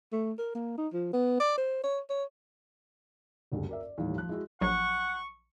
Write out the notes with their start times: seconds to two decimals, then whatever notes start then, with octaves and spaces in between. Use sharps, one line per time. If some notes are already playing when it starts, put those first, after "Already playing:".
0.12 A3
0.39 A#4
0.55 A#3
0.78 D#4
0.93 F3
1.13 B3
1.40 D5
1.57 C5
1.84 C#5
2.09 C#5
3.52 F#1 D2 G2
3.69 A#4 D5 E5
3.81 D5
3.98 D#2 A2 E3 G3 A3
4.15 F3 F#6
4.29 G#3 E4 F#4
4.61 A#1 F#3 F#5 C#6